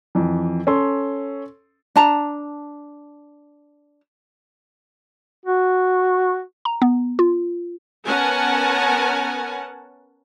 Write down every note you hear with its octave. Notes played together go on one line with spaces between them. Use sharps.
F2 E3
C#4 A4 C6
D4 A5 A#5
F#4
A#5
B3
F4
B3 C#4 A#4 F#5 G#5 A5